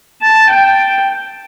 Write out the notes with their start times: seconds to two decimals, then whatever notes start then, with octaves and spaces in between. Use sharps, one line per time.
0.22 A5
0.50 G5